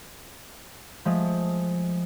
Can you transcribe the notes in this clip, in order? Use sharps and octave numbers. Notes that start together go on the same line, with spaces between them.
F3 G#3 A3